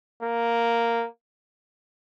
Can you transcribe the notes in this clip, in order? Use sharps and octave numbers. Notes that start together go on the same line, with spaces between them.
A#3